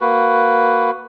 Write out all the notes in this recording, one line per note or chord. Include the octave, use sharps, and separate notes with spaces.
A#3 F#4 B4